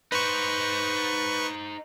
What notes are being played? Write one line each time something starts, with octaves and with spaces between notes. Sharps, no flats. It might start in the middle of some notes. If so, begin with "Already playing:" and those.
D#4 B4 C5 C#6